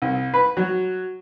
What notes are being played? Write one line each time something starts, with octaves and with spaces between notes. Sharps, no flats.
C2
B4
F#3